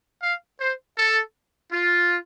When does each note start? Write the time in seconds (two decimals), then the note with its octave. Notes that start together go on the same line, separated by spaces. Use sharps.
0.23 F5
0.61 C5
0.98 A4
1.73 F4